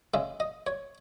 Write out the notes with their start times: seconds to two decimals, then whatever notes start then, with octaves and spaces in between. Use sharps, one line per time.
0.14 C#3 G#3 E5
0.40 D#5
0.67 C#5